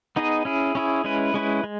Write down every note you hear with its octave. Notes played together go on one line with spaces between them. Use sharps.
B3 D#4 G#4 D#5
C#4 E4 G#4
C#4 E4 G#4
G#3 C#4 E4 B4
G#3 C#4 E4 B4
G#3